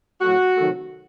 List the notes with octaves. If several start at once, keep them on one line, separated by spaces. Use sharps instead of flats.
A2 F#3 A3 F#4
C3 D#3 F#3 A3